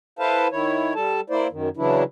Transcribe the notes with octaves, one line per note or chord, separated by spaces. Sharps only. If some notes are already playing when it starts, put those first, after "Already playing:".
E4 A4 B4 C5 F5 A5
D#3 E4 C#5
G3 A4 A5
A#3 E4 C5 D5
F#2 D#3
C#3 E3 F#3 D4 E4